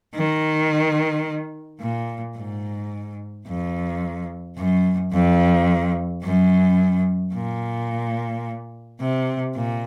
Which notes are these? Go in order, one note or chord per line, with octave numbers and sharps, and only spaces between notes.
D#3
A#2
G#2
F2
F#2
F2
F#2
A#2
C3
A#2